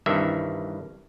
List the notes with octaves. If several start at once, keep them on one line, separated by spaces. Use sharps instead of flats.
C2 G2 D#3 E3 E5